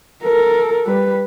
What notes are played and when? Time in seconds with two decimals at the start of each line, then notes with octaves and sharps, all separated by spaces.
0.23 A4 A#4
0.86 G3 B4